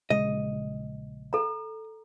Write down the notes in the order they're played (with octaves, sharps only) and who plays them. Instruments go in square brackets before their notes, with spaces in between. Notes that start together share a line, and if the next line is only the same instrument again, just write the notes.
[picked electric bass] A#1 C#3 G#3 [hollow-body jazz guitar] D#5
[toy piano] A4 A#5